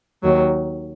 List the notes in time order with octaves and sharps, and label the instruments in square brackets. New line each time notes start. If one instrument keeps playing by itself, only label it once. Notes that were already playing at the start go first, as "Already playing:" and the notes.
[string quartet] D#2 D#3 F#3